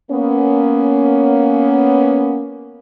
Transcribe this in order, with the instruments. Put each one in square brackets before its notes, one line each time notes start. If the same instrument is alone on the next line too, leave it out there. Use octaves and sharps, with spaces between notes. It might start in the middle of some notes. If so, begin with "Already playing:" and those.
[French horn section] A#3 B3 C#4